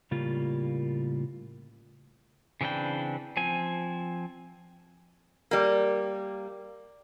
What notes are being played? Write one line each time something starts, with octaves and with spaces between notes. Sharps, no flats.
A2 C#3 G3 A#3 F4
C#3 E3 C4 D4 G5
F3 C4 G#5
G3 A#3